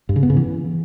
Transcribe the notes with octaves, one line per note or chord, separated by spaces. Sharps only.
G2
C#3
B3
C#3
E3